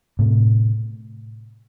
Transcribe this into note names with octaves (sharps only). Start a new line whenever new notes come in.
A2 C3